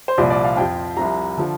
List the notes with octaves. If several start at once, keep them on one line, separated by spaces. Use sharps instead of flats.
C5
C2 A#2 F3 D5
D5
F5
F2 F3 G5
C2 C3 F3 A#5
D3 F3